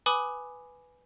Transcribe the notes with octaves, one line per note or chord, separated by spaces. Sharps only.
B4 G#5 B5 D6 D#6